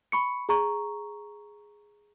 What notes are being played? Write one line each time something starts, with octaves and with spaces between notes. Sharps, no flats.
B5 C#6 C#7
G#4 A#5 C#6